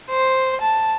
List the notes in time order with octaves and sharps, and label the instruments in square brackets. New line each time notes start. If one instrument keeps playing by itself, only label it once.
[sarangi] C5
A5